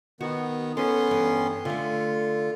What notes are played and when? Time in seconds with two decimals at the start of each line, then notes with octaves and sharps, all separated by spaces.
0.21 D#3 B3 F#4
0.77 B3 C#4 A4 B4 C6
1.08 E2 G2
1.65 D3 A3 F4